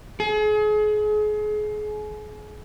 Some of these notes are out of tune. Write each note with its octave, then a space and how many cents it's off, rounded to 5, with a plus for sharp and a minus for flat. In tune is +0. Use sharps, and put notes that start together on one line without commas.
G#4 +35